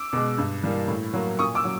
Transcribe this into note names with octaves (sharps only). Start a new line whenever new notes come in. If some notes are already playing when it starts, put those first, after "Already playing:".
Already playing: D6 E6
B2 G#3
G2
E3 G3 A#3
A2
F#3 A#3
A#2 C#6 D#6
D6 E6
F#3